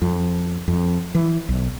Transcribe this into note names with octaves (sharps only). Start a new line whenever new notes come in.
F2
F2
E3
B1